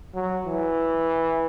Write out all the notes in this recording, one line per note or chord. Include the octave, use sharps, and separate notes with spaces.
F#3
E3